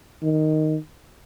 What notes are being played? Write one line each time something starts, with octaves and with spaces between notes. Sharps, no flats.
D#3